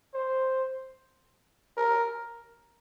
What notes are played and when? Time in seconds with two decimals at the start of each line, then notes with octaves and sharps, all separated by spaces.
0.14 C5
1.77 A#4